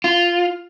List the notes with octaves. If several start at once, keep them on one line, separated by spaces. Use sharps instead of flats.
F4